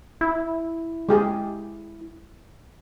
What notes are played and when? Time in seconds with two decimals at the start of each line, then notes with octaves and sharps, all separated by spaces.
0.21 E4
1.09 G#3 G4 G#4